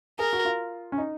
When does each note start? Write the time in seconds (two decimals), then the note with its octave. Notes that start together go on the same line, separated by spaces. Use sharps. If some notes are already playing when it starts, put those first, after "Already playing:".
0.19 G#4 A#4
0.33 F#4
0.45 F4
0.92 C#4
0.98 D#4